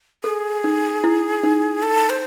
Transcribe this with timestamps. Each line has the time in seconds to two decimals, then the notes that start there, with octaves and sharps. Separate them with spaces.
0.24 G#4 A4
0.64 D#4
1.04 E4
1.44 D#4
1.83 A4
2.10 C5